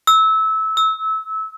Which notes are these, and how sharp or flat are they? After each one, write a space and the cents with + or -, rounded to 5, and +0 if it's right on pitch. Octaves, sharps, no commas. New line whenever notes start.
E6 -20
E6 -25